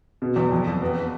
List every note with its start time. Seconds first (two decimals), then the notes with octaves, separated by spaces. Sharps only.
0.22 B2
0.36 E2
0.52 F2
0.67 F2
0.82 B3
0.97 B3